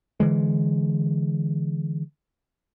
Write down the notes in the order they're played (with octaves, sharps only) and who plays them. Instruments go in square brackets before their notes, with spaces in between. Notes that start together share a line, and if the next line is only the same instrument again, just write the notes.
[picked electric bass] D3 E3 G#3